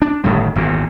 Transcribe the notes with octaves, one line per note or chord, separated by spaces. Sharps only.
D4
G1 A2 D#3 G3
G#1 E2 A#2